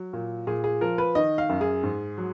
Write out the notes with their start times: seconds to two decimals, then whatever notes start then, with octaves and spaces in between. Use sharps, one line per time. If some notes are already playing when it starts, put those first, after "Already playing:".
Already playing: F#3
0.13 A#2
0.47 A#2 G#4
0.64 G#4
0.81 F3 A#4
0.98 B4
1.15 D#3 D#5
1.38 F5
1.49 F#2
1.61 G#4
1.84 G#2
2.18 F#3